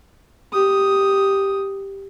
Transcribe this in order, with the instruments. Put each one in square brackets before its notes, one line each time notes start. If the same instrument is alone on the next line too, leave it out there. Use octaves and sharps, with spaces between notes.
[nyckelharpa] G4 D#6